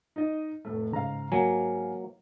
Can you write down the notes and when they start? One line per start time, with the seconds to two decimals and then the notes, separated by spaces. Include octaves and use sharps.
0.16 D#4 D#5
0.65 F1 A2 A3
0.93 G#2 C#3 F5 A#5
1.32 F#3 A#3 G#5